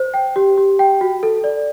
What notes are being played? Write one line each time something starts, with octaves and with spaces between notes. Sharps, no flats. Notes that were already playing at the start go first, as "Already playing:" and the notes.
Already playing: C5
G5
G4
G4
G5
F#4
A4
D5